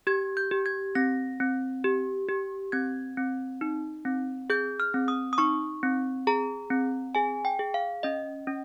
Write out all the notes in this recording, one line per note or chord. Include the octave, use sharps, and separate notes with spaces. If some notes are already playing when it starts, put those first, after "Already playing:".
G4 G#6
G6
G4
G#6
C4 A#6
C4
G4
G4
C4 G#6
C4
D#4
C4
G#4 G6
F6
C4
D#6
D#6
D#4 C#6
C4
G#4 A#5
C4
G#4 G#5
G5
G#4
F5
C#4 D#5
C#4